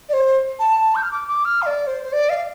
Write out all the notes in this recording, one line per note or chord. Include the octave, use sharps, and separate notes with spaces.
D5
C5
A5
G6
F6
D6
D6
F6
F5
D5
C5
C5
D5
F5